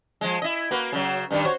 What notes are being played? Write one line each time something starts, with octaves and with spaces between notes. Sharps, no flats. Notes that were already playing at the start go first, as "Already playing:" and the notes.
F3 G#3
E4 D#5
A#3 F#4 B4
C#3 F#3
G2 D#3 D4
F#4 C5 C#5